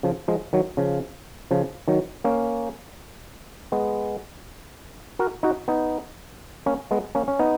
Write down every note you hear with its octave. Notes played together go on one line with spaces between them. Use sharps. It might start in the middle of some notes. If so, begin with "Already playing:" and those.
C#3 F3
F3 G#3
D#3 F#3
C#3 F3
C#3 F3
D#3 F#3
A#3 C#4
G#3 B3
F#4 A#4
D#4 F#4
B3 D#4
A#3 C#4
G#3 B3
A#3 C#4
C#4
B3 D#4